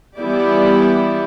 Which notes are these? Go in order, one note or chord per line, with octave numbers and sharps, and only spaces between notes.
E3 G3 B3 E4 G4 D5